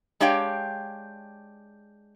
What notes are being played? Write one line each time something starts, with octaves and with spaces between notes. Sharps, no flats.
G#3 D4 G4 C#5 F5 G5